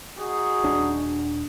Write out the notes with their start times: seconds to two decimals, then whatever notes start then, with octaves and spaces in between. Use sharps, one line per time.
0.18 D#4 F#4 G#4
0.63 D#1 D4